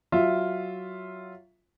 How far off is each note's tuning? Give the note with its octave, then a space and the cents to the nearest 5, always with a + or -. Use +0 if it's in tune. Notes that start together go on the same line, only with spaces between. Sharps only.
F#3 +10 F4 +0 E5 +0